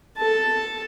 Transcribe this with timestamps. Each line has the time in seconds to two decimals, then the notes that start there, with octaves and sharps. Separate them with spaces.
0.17 A4 A5